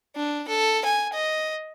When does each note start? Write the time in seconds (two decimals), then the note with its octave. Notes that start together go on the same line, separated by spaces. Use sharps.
0.16 D4
0.48 A4
0.85 G#5
1.14 D#5